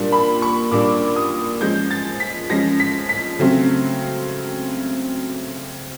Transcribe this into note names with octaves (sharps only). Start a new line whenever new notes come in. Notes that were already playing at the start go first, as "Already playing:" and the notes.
Already playing: A#2 G3 A#3 D4
B5
C#6
A#2 G3 A#3 D4 D6
D#6
F3 G#3 C#4 G6
A6
B6
F3 G#3 C#4 A#6
B6
B6
C#3 F#3 A3 C4